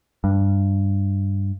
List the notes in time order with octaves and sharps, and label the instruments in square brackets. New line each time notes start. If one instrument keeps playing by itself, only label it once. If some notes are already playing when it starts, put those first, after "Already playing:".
[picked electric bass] G2